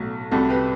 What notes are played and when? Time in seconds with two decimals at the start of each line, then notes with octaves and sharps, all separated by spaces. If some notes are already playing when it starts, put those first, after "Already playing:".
Already playing: B1 A2 F#3
0.31 C2 C3 G3 F#4 A4
0.49 G4 B4